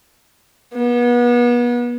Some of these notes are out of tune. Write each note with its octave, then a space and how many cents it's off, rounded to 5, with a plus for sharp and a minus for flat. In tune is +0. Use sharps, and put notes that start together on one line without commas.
B3 -35